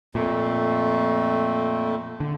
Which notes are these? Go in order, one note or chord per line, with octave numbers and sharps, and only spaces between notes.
F2 A#2 A3
D3